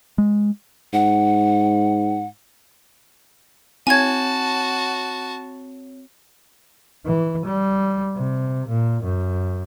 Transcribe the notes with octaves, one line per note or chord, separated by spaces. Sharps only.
G#3
G#2 F#5
C4 F#4 C#5 G#5 A5 G#6
E3
G3
C3
A#2
F#2